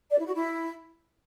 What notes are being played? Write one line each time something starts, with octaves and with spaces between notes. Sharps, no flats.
D5
E4
F#4
E4